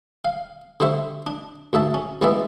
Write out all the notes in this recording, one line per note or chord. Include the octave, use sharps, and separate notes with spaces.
F5
D3 G3 C5 E5 C#6
D4
D2 G#2 E5 A5
C#4
A1 E3 G#3 B3 D5 E5